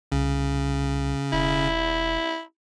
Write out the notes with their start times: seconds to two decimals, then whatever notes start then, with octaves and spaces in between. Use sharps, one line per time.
0.12 C2 C#3
1.32 E1 E4